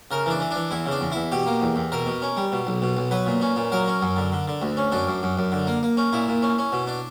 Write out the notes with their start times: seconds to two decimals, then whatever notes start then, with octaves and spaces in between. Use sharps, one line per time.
0.11 C#3 A#4
0.26 E3 D4
0.40 E3
0.51 E3 D4
0.71 E2 E4
0.86 C#3
0.91 D4
1.01 E2
1.12 E2 E4
1.32 B2 G4
1.46 A#3
1.61 E2
1.76 E2
1.92 B2 A#4
2.06 B2
2.22 C#4
2.37 G3
2.52 B2
2.67 B1
2.82 B2
2.97 B1
3.11 F#3 B4
3.27 A#2
3.41 C#4
3.56 A#2
3.72 F#3 A#4
3.88 C#4
4.01 F#2
4.17 D3
4.32 D3
4.48 D3
4.62 D2
4.77 C#4
4.92 F#2 D4
5.07 F#2
5.23 F#2
5.38 F#2
5.52 D3
5.67 A#3
5.83 A#3
5.97 C#4
6.13 A#2 E4
6.28 A#2
6.42 C#4
6.58 C#4
6.72 B2
6.87 D4